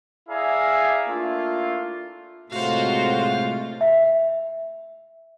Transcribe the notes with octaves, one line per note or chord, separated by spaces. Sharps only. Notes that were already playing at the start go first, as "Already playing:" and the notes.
E4 G#4 D5 E5 F5 A#5
A3 A#3 D4 E4 F4
A2 C3 G#3 A3 F4 F#4 C5 F5
E5